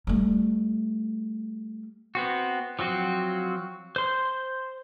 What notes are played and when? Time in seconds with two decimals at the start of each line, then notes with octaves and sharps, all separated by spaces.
0.07 G3 A3
2.15 B3 C4 F#4
2.79 F3 F#3 C4 F#4
3.96 C5 C6